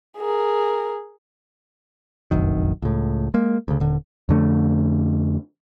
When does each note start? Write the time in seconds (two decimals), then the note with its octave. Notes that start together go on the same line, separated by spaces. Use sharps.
0.18 G#4 A#4
2.31 F1 A#1 F#2 D#3
2.82 C#2 A2
3.34 G#3 A#3
3.68 D2 C#3
3.80 D#1 D3
4.29 F2 D3 A3